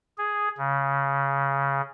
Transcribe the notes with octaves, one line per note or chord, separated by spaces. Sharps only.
G#4
C#3